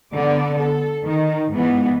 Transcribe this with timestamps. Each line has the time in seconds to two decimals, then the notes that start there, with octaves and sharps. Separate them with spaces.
0.13 D3 B3 D5
0.58 A4
1.06 D#3
1.53 G#2 E3 B3